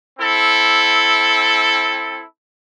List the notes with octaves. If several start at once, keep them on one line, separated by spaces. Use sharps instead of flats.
C4 E4 A4